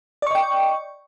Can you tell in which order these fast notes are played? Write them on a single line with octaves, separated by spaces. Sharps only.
D5 C#6 D#5 G5